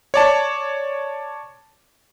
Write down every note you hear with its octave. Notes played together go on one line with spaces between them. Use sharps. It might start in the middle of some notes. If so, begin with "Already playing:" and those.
C#5 D5 A5